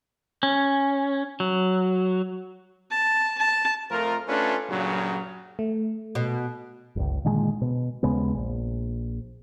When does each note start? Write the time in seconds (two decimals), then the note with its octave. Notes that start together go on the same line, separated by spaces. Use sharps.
0.43 C#4
1.40 F#3
2.91 A5
3.38 A5
3.91 F2 F3 A3 F4 A#4
4.28 A3 C#4 D4 F4 A4 B4
4.70 G2 A#2 C#3 F#3
5.59 A3
6.15 B2
6.96 G1 C#2
7.25 A#2 D3 D#3 G#3
7.61 B2
8.03 D#2 C#3 G#3 B3
8.35 A#1